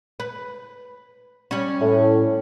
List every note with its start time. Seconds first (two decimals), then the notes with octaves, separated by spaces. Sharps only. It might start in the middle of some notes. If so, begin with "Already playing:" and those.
0.20 B4
1.51 G3 C#4
1.80 A2